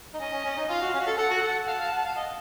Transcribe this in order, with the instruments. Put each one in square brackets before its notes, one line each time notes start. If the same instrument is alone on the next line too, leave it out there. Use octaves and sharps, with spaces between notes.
[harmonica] D#4
[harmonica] C#4 [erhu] D#5
[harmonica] C#4
C#4
D#4
[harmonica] F4 [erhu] F5
[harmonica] F#4
C#4
F#4
A4
[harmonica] A4 [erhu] F#5
[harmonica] F#4
A4
[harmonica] F5 [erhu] A5
[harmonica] F#5
F5
F#5
F5
D#5